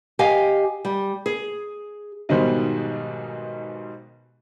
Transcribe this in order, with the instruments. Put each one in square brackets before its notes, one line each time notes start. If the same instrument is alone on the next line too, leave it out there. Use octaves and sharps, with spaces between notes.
[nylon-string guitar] G4 D#5 F5 G#5
G3
G#4
[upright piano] B1 G#2 B2 D#3 G3 C5